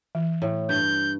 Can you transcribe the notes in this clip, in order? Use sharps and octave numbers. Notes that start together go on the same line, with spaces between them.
E3
A2
G2 G6